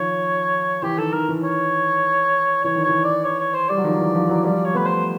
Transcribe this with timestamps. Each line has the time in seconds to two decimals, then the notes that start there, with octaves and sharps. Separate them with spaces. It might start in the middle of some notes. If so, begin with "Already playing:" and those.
Already playing: D#3 F3 C#5
0.83 E3 G4
0.98 D#3 A4
1.13 D#3 A#4
1.29 E3
1.43 C#5
2.64 E3 C#5
2.76 D#3
2.84 E3 C#5
3.04 D5
3.24 C#5
3.39 C#5
3.54 C5
3.69 G3 D5
3.78 F#3
3.84 D#3 F3
3.99 E3
4.15 D#3 F3
4.29 E3 F#3
4.44 F3 G3 D5
4.65 C#5
4.74 A3 B3 B4
4.85 C5